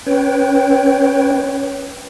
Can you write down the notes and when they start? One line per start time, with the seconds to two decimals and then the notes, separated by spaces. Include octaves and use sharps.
0.06 C#4 B4 C#5 G5